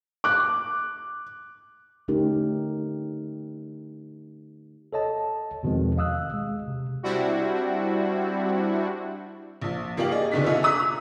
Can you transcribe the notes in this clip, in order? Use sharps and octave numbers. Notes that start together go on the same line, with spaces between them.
D6 F#6
D3 A3 C#4 D#4 G4 A#4
A4 C#5 D#5 A5
E2 B2 D#3 F3 G#3 C4
D#5 F5 D#6 E6 F#6
G#3
C3
G3 C4 D4 E4 F#4
A#1 F3
G#1 A#3 F4 G4 F5 F#7
G#4 D5 D#5
F1 B2 D3 D#4 B6
F4 A4 D#5 E5 G#5
A#5 D#6 F#6 B6